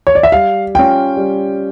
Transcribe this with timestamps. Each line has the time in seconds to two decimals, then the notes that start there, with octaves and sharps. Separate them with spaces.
0.07 C#5
0.15 D5
0.23 E5
0.32 G3 F5
0.74 C#4 F4 G5
1.17 G3